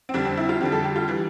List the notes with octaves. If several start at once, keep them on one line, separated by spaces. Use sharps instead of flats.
C4
F2 D3 G3 D4
C4
E4
F4
F2 D3 G3 G4
A4
G4
F4
E3 G3